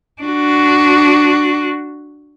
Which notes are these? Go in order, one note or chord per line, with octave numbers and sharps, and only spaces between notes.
D4 F#4